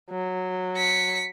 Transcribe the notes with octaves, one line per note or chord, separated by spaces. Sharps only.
F#3
B6 C#7